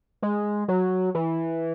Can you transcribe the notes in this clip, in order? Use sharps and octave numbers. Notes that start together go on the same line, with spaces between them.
G#3
F#3
E3